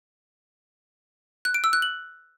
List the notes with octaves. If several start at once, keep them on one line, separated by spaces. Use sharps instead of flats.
F#6
D7
E6
F#6
F#7